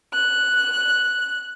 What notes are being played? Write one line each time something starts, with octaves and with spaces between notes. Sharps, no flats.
F#6